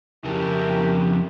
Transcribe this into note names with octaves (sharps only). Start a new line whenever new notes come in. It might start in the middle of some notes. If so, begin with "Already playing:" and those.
F2 C#3 E4 G4 A#4